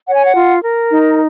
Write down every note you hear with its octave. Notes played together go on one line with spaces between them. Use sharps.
C#5 F#5
G#5
F#5
F4
A#4
D#4